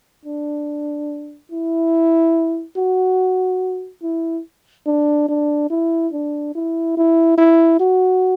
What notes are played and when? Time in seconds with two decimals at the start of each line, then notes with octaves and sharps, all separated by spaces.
0.25 D4
1.51 E4
2.77 F#4
4.02 E4
4.86 D4
5.28 D4
5.70 E4
6.13 D4
6.55 E4
6.97 E4
7.38 E4
7.79 F#4